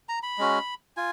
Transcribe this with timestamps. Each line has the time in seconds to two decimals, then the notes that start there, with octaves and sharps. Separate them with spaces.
0.09 A#5
0.23 B5
0.38 G#3 C#4 F#4
0.97 F4 G#5